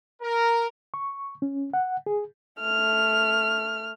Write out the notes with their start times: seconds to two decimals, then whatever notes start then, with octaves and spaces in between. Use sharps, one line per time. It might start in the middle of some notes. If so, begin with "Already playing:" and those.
0.22 A#4
0.94 C#6
1.42 C#4
1.74 F#5
2.06 G#4
2.60 A3 F6